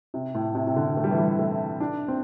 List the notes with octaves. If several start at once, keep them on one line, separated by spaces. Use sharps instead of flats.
C3
A2
C3
C3
D3
A3
G3
E3
G3
A3
D4
C4